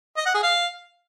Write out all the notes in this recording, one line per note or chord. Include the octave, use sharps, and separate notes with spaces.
D#5
F#5
G#4
F5